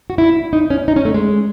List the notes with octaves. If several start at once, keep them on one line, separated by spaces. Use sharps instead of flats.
F#4
E4
D#4
C#4
D#4
C#4
A3
G#3